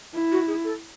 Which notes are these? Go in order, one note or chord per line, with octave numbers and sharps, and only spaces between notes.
E4
F#4
G#4
A4